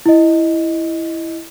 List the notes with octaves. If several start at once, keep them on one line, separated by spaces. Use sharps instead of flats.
E4 D#5